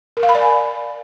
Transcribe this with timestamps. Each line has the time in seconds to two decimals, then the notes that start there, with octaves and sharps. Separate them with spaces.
0.17 A#4
0.23 F5
0.29 B5
0.35 D5
0.41 G#5